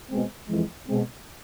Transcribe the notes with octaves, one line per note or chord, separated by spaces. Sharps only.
B2 G#3 C4
F2 E3 G#3
B2 G#3 C4